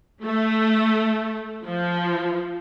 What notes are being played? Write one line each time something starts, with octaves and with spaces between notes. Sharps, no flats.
A3
F3